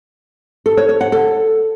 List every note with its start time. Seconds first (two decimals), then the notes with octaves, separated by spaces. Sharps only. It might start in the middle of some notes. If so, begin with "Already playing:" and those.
0.66 A4
0.77 C#5
0.89 C#5
1.01 F#5
1.12 A4